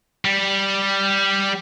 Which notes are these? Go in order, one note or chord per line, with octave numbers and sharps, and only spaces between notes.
G3 G4